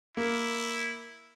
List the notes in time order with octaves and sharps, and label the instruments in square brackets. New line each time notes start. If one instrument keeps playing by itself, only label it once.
[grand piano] A#3 [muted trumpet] E4